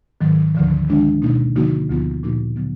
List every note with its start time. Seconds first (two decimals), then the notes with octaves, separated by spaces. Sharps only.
0.21 G#2 D#3 F#3
0.55 D2 D3 F3
0.88 D#3 G#3 D4
1.22 B2 A#3 D#4
1.55 D3 F3 A#3 D#4 F#4
1.89 D2 D3 F3 B3 F4
2.23 A#2 F3 A#3 D#4 F#4
2.56 D3 F#3 B3